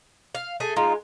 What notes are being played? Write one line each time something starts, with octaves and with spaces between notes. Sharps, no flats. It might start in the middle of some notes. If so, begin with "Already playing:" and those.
F5
A3 G#4 G#5
G#3 D#4 F4